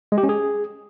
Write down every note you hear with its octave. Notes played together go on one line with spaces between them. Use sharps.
G#3
G4
C#4
G#4